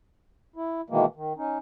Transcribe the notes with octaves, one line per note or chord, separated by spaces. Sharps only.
E4
B2 D#3 E3 G#3 A#3
D#3
C#4 D#4